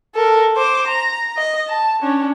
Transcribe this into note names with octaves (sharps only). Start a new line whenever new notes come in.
A4 A#4
C5 D6
A#5
D#5
A5
C#4 D4